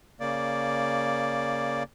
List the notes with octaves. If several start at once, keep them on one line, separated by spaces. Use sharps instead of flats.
C#3 A#3 D5